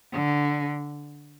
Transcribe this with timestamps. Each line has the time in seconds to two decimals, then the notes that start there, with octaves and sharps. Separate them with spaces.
0.13 D3